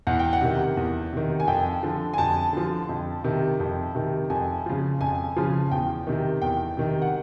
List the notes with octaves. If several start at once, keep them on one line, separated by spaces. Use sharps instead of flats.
E2 F#5
G5
F#5
C3 D#3
E2
C3 D#3
G#5
F2 G5
D3 F3
G#5
F2 A5
D3 F3
F2
C3 D#3
F2
C3 D#3
F2 G#5
C#3 F3
F2 G#5
C#3 F3
E2 G5
C3 D#3
E2 G5
C3 D#3
F#5